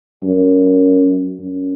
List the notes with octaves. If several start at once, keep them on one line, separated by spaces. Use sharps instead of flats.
F#2
F#2